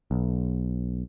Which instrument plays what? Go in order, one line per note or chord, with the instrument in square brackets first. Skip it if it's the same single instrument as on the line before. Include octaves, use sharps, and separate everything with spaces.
[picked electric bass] B1